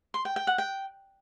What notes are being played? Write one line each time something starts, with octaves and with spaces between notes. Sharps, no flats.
C6
G5
G5
F#5
G5